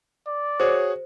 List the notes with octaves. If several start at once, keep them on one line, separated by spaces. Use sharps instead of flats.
D5
F#4 G#4 C5 C#5